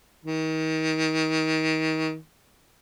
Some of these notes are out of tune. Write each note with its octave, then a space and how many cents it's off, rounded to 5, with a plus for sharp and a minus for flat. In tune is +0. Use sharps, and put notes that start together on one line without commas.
D#3 +30